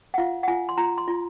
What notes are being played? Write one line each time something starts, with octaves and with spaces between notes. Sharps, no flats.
F#5
F4 F5
F#5
F4 G#5
C6
F4 A#5
C6
F4